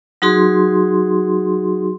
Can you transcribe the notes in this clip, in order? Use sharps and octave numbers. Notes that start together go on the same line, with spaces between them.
F#3 D#4 F#4 G#4 C6